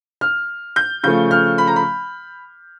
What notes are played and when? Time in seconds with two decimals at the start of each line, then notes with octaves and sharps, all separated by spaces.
0.21 F6
0.76 G6
1.04 C#3 F3 A3 G6
1.31 F6
1.58 B5
1.67 A#5
1.76 B5